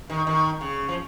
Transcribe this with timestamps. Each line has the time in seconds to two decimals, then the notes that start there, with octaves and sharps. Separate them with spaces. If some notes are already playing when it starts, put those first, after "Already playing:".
0.10 D#3
0.27 D#3
0.61 C#3
0.88 F3